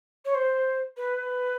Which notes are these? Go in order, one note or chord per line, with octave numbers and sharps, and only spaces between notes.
C#5
C5
B4